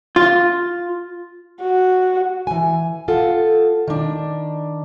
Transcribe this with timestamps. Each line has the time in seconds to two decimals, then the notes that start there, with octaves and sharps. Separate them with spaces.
0.16 F4
1.62 F#4
2.47 E3 G#5
3.08 F4 A4 F#5
3.88 D#3 D4